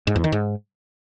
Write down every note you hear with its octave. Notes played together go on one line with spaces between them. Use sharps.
G#2
E2
D#3
G#2